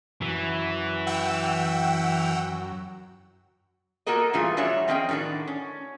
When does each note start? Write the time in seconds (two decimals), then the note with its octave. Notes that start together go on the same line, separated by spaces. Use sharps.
0.22 F#2 E3
1.07 F#5 G5 E6
4.06 A#3 F4 F#4 A4 A#4 D#5
4.33 G2 A#2 E3 A3 F4 G#4
4.57 E3 G3 D4 F#4 C#5 E5
4.88 F3 C4 C#4 G#4 D#5 G5
5.09 A2 D#3 B3 D4 F#4
5.48 C#4